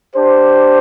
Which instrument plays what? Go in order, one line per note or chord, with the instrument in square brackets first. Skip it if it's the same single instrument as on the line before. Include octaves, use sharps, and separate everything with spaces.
[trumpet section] D4 G4 C5